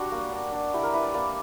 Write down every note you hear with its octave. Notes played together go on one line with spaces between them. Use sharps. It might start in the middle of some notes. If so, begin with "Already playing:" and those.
Already playing: G3 D4 F#4
A#3
D4
D4
E4 G4
A#4
E4 B4
D5
A#3 D5